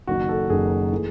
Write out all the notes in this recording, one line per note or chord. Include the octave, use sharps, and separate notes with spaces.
F#1 F#2 D#3 F#4
A4
F#1 F#2 D#3 G#4
E3 A3